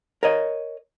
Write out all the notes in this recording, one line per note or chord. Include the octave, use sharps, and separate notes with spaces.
A#4 C#5 D#5